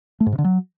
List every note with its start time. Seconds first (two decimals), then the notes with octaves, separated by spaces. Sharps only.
0.20 A3
0.26 G#2
0.32 C3
0.38 D3
0.44 F#3